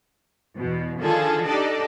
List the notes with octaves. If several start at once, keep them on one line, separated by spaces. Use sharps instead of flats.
E2 B2
D3 D#3 F3 F4 G#4 A4
D4 D#4 G4 A4 D5 D#5